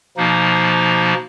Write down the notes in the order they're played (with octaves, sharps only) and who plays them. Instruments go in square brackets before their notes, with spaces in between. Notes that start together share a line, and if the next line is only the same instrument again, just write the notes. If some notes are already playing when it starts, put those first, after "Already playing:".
[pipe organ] B2 F3 A#3 D#4